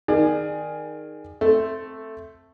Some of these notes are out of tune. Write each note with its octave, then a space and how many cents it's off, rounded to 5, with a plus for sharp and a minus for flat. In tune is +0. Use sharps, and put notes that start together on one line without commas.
D#3 +0 G#4 +0 D5 +30
A3 +0 C4 +5